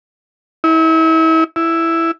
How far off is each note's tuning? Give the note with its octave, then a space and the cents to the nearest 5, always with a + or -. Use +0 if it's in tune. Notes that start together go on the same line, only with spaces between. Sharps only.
E4 -35
E4 +5